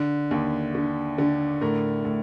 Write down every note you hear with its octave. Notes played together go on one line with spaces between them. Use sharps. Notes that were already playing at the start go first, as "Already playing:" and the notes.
Already playing: D3
D#2
D3
D3
A2 A#4
A2